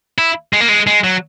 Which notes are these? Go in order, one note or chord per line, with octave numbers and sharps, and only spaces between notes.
E4
G#3
A#3
G#3
G#3
F#3